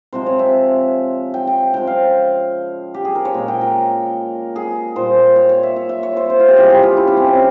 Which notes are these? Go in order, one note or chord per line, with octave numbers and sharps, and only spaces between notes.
C3 F3 G#3 C5
C#5
E5
G5
G5
C#3 F3 G#3 G5
F5
G4
G#4
A#4
C#5
A#2 G#3
G5
A#4
G#4
A#2 G3 C5
C#5
C#5
E5
E5
E5
C#5
C5
C5
F4
G4
C#3 E3 G3 G#4
G4
F4
E4
C#4
C4
C#4